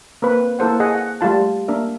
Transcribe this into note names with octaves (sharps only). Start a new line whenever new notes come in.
A#3 C4 B4
A#3 E4 A4 C5 F#5
G#4 D#5 F#5
F#5
G3 A3 F4 A5
A#3 D4 A#4 E5